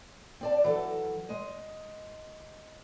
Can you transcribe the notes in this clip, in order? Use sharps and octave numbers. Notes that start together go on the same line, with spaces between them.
C4 D5 A5
E3 F#3 A4
G#3 D#5